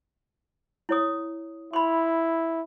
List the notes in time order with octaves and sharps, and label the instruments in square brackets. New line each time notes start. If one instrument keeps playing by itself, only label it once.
[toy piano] E4 C#5 D#6
[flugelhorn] E4 [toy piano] B5 C6